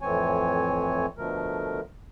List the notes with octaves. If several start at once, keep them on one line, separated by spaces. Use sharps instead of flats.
F2 A2 E3 C4 C#5 G#5
B2 D3 F3 A3 A#4